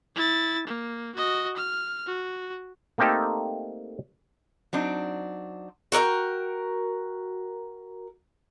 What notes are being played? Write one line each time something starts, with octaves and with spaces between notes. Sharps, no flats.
E4 A6
A#3
F#4 D#5
F6
F#4
A3 A#3 C4 D#4 G4 A4
F#3 C4 D4 D#4
F#4 A#4 C#5 G5